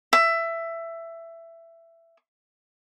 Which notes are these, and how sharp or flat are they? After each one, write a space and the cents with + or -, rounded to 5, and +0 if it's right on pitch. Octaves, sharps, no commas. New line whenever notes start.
E5 +15